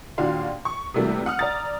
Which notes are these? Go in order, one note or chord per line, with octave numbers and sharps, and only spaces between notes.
D#2 A#2 D4 F#4 F5 C6
C#6
C3 E3 F#3 G3 A3 A#3
F#5 D#6 F6
D5 A#5 A6